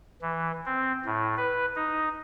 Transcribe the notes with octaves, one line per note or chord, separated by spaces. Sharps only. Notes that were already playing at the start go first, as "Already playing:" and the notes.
E3
C4
A2
B4
D#4